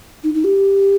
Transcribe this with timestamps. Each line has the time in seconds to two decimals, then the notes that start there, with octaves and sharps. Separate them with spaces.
0.24 D#4
0.34 D#4
0.44 G4